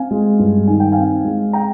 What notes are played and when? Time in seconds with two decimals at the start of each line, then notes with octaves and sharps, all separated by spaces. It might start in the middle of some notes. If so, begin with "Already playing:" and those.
Already playing: C4 F5 G#5
0.11 G#3
0.39 G2
0.67 D#3 G#5
0.80 G5
0.92 C4 F5 G#5
1.25 G#3
1.53 G5 A#5